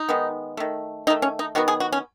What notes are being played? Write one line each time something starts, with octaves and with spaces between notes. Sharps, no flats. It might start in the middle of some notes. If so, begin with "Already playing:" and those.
Already playing: D#4
D#3 G#3 B3
D#3 A3
D#3 A3 D#4
C#4
D#4
D#3 F#3 B3 F#4
G#4
F#4
C#4